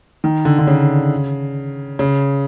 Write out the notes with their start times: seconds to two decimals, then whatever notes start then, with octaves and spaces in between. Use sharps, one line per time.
0.24 D#3
0.45 D3
0.59 D3
0.67 C#3
1.99 C#3